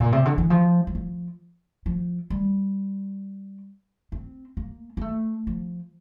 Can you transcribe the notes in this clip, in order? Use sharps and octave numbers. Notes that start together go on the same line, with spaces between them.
A#2
C3
D3
E3
F3
G3
F3
F3
G3
C4
A#3
A#3
A3
F3